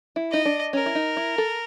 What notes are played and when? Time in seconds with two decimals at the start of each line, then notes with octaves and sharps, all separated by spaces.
0.16 E4
0.31 D#4 D#5
0.45 D4
0.73 C#4 A#4
0.86 E4
0.95 D#4
1.17 E4
1.38 A4